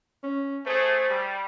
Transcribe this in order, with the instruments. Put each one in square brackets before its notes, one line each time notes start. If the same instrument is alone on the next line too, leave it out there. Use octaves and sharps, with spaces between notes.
[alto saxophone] C#4
[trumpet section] A3 G#4 [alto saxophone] C5
[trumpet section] G3